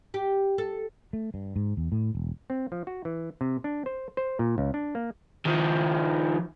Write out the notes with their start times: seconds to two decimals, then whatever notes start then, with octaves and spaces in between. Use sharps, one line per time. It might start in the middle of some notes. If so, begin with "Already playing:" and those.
0.14 G4
0.58 A4
1.13 A3
1.34 G2
1.56 G#2
1.77 E2
1.92 A2
2.15 E1
2.50 C4
2.72 F3
2.87 F#4
3.05 E3
3.41 C3
3.64 D4
3.86 C5
4.17 C5
4.39 A#2
4.58 C#2
4.74 D4
4.95 A#3
5.45 D#3 F3